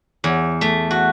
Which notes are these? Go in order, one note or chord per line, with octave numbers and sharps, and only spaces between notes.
E2
A3
F#4